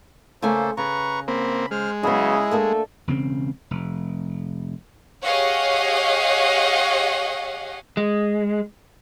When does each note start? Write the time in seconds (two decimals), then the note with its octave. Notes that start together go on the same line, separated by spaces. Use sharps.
0.42 C#3 A3 A#3 A4 C5 G#5
0.77 C#3 B4 A#5 C#6
1.28 A#3 C4 B5
1.71 G#3 C5 F6
2.03 C#3 F#3 B3 E4 G#4 D#5
2.51 A3 A#3 D4 A4
3.07 E1 C#3 C4
3.71 F1
5.23 G4 G#4 C#5 D#5 F5 F#5
7.97 G#3